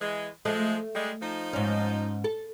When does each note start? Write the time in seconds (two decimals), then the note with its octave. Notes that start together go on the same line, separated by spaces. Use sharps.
0.01 E3 G#3
0.45 F3 G#3 A3
0.95 G3 G#3
1.21 F3 D#4
1.53 G#2 C#4
2.24 A4